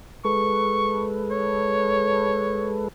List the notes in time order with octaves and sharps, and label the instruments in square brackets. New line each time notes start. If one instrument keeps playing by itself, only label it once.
[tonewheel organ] G#3 A4 B4 [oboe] C#6
[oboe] C#5